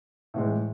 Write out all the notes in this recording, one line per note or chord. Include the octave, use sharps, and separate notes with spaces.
A2 E3 G#3